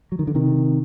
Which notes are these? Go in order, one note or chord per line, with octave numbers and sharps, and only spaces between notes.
F#3
D#3
D3
C3 D#3